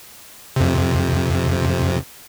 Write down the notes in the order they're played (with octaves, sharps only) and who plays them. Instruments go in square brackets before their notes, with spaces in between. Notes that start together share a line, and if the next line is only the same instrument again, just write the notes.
[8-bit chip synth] F2 C3